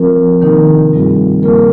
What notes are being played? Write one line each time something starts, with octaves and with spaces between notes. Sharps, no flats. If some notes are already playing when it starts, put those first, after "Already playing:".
Already playing: F3 C4 F4 A#4
C3 D#3 A#3 D#4 A#4
G2 G3 C4 F4 G#4
C#3 G3 A#3 F4 A#4